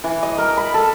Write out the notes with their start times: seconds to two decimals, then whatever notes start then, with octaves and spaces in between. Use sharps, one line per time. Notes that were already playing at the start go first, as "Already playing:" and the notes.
0.04 E3
0.23 D#5
0.38 A#4
0.57 B5
0.74 A4